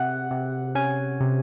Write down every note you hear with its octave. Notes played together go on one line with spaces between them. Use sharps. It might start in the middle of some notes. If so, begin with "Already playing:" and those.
Already playing: C3 F#5
C3
C#4 G#5
C3